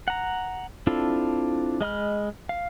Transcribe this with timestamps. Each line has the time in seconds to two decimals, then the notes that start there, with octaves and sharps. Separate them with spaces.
0.08 F#5 A#5
0.87 C4 D4 E4 F4 A4
1.81 G#3 D#5 B5 F6
2.49 F5